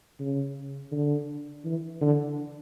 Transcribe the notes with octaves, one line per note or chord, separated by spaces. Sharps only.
C#3
D3
E3
D3